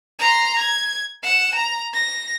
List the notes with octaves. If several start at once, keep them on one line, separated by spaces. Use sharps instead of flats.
A#5 C6
G#6
F#5 E7
A#5
A#6